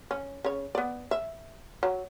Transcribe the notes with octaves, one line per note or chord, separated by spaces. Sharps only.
C#4
C#3 C#5
B3 D5
E5
F#3